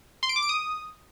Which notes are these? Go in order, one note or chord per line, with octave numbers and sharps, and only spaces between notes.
C6
D7
D6
D7
D#6